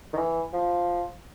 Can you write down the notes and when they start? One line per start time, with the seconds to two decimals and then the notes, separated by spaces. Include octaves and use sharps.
0.13 D#3
0.17 E3
0.53 F3